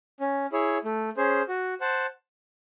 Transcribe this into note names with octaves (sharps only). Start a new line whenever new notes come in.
C#4
E4 G#4 C#5
A3
C#4 G#4 C5
F#4
C5 F#5 A5